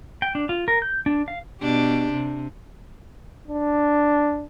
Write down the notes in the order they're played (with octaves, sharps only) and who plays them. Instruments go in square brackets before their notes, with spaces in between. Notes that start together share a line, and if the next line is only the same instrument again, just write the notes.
[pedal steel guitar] G5
D4
F4
A#4
G6
D4
F5
[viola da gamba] B2 D4 G4
C3
[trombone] D4